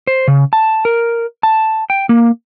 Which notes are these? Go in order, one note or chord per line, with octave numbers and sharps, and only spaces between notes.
C5
C#3
A5
A#4
A5
G5
A#3